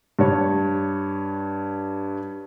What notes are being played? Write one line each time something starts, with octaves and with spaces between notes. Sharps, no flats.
G2 C#5